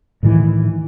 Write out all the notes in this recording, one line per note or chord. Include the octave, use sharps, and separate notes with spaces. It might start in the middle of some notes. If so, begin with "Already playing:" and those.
A2 D#3 E3